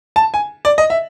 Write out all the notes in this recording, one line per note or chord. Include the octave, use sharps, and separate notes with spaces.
A5
G#5
D5
D#5
E5